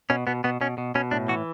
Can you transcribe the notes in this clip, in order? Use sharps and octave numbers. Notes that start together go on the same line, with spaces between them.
B2 C#4
B2 B3
B2 B3
B2 C#4
B2
B2 C#4
A2 D4
E3 F#4